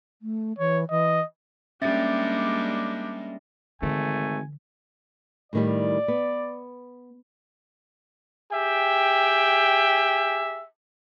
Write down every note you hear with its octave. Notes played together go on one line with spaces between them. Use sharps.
A3
E3 C#5
E3 D#5
G3 G#3 A#3 C#4 D4 G4 E5 A6
G#1 D3 E3 A3 G#5
A2 D#3 G3 D5
B3
G4 G#4 E5 G5